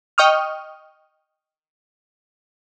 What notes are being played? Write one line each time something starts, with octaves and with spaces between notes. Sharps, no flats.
D#5 G5 C#6 D#6 F6